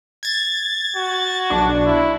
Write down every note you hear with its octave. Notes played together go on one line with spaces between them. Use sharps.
G#6 A6
F#4
B1 D4
E4